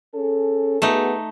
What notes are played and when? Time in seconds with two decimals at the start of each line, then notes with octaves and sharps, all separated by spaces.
0.13 C#4 G#4 A4
0.82 A3 B3 D#4 F#4 G#4